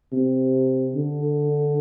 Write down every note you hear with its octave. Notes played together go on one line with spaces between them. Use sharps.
C3
D3